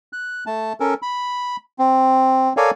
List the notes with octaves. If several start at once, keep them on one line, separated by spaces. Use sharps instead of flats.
F#6
A3 A5
C#4 A4 A#4
B5
C4
A4 A#4 C#5 D5 F5 G#5